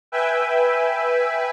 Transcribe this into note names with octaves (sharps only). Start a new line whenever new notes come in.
B4 E5 G5 G#5